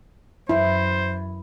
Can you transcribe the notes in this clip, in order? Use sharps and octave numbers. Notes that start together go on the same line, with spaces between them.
F#2 E4 C5